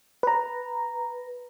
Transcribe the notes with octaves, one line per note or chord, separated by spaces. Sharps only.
B4 A#5